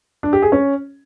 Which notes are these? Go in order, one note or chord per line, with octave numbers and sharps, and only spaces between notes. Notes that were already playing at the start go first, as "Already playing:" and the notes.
D4
G4
G#4
C#4